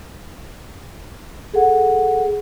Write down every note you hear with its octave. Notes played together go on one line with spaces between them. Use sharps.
G#4 A4 F#5